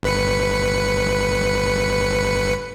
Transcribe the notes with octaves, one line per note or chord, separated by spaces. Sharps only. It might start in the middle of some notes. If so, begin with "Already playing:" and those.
G1 B4 C#7